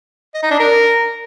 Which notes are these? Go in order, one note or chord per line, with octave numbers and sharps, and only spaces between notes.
D#5
D#4
D4
A#4